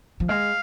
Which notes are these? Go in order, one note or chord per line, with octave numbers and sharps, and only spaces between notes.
F3
G#3 F5